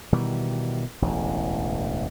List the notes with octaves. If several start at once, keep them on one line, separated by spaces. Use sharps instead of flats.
B2 D#3 E3 G3
E1 A1 D2